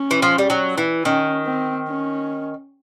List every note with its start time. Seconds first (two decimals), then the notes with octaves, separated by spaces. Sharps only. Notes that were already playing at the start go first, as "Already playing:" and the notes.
Already playing: C#4
0.11 E3
0.22 F3
0.38 G3
0.50 F#3
0.78 E3
1.04 D#3 C#4
1.46 C4
1.87 C#4